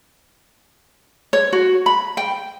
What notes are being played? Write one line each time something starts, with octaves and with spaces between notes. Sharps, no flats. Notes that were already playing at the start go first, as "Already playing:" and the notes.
C#5
F#4
B5
G5